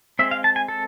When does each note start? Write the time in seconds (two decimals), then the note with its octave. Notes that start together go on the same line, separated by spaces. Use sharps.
0.19 G#3 C4 E5
0.31 F5
0.44 A5
0.56 G#5
0.68 A4